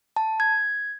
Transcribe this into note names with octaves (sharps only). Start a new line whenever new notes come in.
A5
G#6